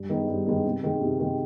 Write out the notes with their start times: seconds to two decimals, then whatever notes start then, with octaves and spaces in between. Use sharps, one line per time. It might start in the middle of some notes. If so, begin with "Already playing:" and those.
Already playing: G2
0.09 D#3 G#3 B3 D#4
0.28 G2
0.46 D#3 G#3 B3 D#4
0.65 C3
0.83 D#3 G#3
1.01 C3
1.20 D#3 G#3